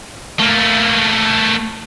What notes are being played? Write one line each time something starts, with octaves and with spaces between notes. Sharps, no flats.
A3 A#3